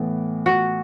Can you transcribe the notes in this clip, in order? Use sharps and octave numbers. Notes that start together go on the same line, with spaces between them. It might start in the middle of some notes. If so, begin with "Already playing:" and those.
Already playing: A2 E3 B3
F#4